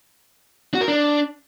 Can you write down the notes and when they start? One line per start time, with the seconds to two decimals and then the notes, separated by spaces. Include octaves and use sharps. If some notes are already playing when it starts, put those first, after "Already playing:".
0.74 F#4
0.81 A#4
0.88 D4